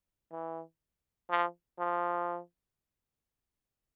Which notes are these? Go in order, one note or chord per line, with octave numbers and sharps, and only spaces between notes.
E3
F3
F3